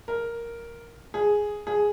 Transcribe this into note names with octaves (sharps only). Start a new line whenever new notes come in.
A#4
G#4
G#4